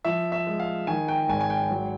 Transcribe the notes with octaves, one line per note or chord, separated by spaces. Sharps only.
F3 E5
E5
G#3
F5
D#3 G#5
G5
G#1 G#5
G#5
G5
F#3